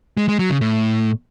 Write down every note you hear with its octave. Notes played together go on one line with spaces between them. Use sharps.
G#3
G#3
F#3
C#3
A2